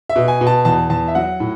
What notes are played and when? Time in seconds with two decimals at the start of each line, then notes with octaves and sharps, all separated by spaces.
0.09 E5
0.16 B2
0.28 G#5
0.41 B2
0.47 A5
0.65 E2 A5
0.90 E2 A5
1.08 E5
1.15 F#3 F#5
1.40 A2